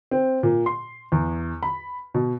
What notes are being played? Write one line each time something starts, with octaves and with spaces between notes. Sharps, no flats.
C4
A#2
C6
E2
B5
B2